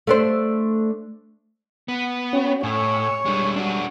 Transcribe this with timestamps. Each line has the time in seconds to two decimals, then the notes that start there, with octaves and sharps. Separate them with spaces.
0.07 A3 D4 C5
1.88 B3
2.33 C#4 F#4 C#5 G5
2.63 A2 C#5 G#5 E6
3.25 G3 G#3 D4 C#6
3.56 F#3 G#3 D4